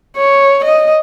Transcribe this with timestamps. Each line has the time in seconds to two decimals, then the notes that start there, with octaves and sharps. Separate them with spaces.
0.17 C#5
0.65 D#5